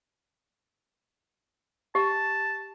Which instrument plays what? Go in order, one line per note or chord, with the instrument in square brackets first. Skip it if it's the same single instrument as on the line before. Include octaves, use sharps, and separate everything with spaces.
[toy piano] G4 [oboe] A5